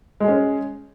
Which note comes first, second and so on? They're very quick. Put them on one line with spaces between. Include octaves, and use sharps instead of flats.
G#3 G#4 C#4